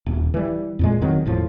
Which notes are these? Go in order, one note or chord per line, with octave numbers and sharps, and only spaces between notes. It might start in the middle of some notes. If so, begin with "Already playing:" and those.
D#1
E3 G3
F2 A#2 G#3
F1 D#3 F#3 C4
E1 A2 F3